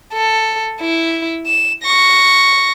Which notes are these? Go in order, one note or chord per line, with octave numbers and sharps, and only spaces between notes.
A4
E4
E7
C#6 A#6